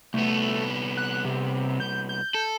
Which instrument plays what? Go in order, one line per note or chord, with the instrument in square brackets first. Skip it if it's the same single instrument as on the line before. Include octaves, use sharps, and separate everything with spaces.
[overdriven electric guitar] C2 B3 [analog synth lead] A3
[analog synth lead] F#6
C3
G6
G6
[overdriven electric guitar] A4